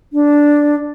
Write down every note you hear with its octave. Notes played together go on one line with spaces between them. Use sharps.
D4